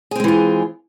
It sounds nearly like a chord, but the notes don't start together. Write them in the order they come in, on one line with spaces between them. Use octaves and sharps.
G#4 C4 G#3 E3 F4